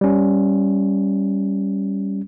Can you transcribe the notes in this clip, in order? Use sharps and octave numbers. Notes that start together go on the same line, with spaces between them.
G3 C#4